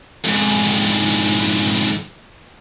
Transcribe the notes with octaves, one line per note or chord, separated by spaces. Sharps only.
F2 G#2